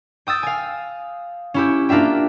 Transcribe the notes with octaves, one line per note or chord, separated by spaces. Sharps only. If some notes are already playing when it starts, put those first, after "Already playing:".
G5 D#6 E6 A6
F5 G#5
C#4 E4 G4
A#3 D4 F4 E5 G5